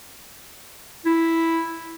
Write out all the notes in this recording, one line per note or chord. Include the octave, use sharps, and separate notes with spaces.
E4